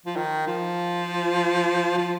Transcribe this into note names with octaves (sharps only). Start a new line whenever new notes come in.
F3
D#3
F3
F3